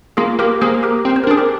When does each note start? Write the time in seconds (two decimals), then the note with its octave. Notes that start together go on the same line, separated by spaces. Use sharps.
0.17 A#3 F4 G#4
0.39 A#3 G4 A#4
0.61 A#3 G#4 C5
0.83 G4 A#4
1.05 C4
1.16 C5
1.24 A#4
1.27 D4
1.31 G#4
1.37 G4 A#4